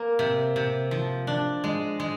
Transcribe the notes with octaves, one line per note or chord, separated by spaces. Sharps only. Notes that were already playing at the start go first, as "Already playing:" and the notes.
Already playing: A#3
C3
C3
F3
D4
G#3
G#3